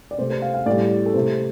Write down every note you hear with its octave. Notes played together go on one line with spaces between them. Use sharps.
D5
C3 A3 C5
C5
F5
F5
A2 G3 D5
A4
C3 A3 C5